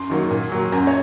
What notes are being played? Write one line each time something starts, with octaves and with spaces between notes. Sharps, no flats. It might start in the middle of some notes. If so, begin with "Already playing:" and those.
Already playing: F#2 C6
D#3 F#3 A#3
A#2
F#3 A#3
F#2 A#5
C#5